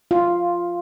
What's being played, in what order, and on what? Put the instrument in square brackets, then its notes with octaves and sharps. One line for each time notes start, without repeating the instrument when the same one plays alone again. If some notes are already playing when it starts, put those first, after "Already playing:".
[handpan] F4